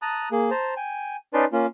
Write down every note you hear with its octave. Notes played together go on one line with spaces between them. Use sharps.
A5 A#5 D#6 F#6
A#3 G#4
C5 A5 A#5
G5 G#5
C#4 D#4 B4 D5 A5 C6
A#3 C#4 F4